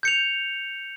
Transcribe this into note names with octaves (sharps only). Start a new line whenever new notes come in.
G6 C#7 F7